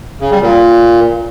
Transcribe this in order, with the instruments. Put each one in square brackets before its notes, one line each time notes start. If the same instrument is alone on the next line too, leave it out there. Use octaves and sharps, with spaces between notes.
[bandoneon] C#3
G3
A#2